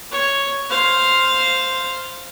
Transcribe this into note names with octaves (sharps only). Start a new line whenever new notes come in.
C#5
C5 F5